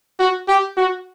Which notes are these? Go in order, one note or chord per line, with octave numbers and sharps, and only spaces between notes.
F#4
G4
F#4